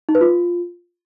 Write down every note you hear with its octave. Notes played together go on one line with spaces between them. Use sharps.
D#4
B4
F4